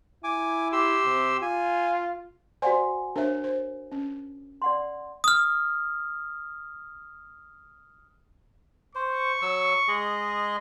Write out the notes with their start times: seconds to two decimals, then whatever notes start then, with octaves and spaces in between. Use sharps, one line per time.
0.24 E4 G#5 D6
0.72 G4 C6 E6
1.05 C3
1.42 F4 G#5
2.62 F#4 C5 D5 F#5 G#5 C6
3.16 D4 A#4 C5 C#5 E5
3.44 C5
3.92 C#4
4.62 D5 F#5 C6
5.24 D#6 F6
8.95 C5 C#6
9.42 F#3 E6
9.88 G#3 G#4 D#5